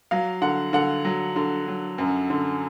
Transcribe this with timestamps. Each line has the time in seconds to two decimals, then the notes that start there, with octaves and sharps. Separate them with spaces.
0.11 F#3 F5
0.42 D3 F#5
0.73 D3 F#5
1.05 F#3
1.36 D3
1.68 F#3
1.98 F#2
2.30 D3